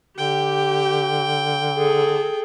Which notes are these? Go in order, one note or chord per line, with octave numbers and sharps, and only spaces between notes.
D3 G4 G5
G#4 A4